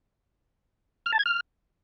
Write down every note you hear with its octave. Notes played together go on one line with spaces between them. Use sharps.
F6
A5
G#6
F6